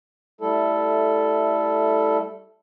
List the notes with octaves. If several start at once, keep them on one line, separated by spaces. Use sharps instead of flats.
G3 A3 E4 A4